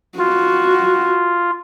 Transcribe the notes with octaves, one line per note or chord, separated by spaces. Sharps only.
F4 F#4